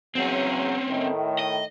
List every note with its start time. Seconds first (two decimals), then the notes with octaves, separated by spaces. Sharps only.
0.15 E2 C#3 F#3 C4 C#4
0.89 A2 D#3
1.39 D#5